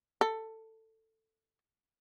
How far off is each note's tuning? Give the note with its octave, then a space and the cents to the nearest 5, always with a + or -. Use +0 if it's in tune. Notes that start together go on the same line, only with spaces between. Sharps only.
A4 +15